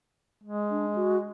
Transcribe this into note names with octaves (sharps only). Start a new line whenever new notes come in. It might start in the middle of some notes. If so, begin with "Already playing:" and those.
G#3
D4
F#4